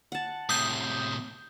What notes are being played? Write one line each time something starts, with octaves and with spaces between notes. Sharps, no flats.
F#5 A5
A2 C3 D#6 G6